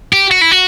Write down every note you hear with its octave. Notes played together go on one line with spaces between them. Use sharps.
G4
F#4
E4
F#4